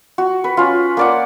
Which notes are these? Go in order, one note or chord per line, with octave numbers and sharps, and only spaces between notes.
F#4
B4
C#4 F4
A#3 D5 F#5